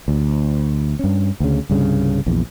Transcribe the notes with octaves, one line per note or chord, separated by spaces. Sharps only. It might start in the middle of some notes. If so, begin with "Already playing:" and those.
D2
G2 C#4
D2 C#3
C2 G2 C#3
A#1 E2